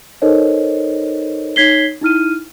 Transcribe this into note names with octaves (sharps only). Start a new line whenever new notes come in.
D#4 A4 A#4 C5 C#5 D#5
D#4 C#5 G#6 B6 C7 G7
D#4 E4 F6 D#7